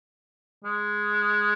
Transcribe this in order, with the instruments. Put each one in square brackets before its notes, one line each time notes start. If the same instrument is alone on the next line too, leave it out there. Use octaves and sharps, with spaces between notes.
[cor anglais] G#3